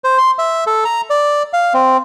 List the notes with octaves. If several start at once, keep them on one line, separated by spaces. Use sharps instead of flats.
C5
C6
E5
A4
A#5
D5
F5
C4